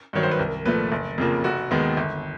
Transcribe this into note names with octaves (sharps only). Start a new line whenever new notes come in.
G2 D#3 F#3 C#5
C5
B4
C2 A#4
A#2 F3 A3 B4
F#1
F2 C#3 F3 A#3
F1 F#4
D#2 D#3 G#3 B3
G1